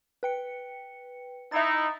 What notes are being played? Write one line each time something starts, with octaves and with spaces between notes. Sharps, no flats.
B4 G5 C#7
D#4 E4 E5 A6